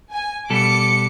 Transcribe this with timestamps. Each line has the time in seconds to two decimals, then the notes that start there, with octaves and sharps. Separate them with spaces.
0.12 G#5
0.50 B2 G3 A4 D6 C#7